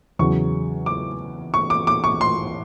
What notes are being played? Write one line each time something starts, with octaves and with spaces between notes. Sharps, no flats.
E2 C#3 F#3 C#6
D6
C#6
D6
D6
C#6
C6